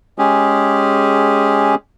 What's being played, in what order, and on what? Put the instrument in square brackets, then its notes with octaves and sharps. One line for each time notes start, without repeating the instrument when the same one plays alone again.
[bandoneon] G#3 C#4 G4 G#4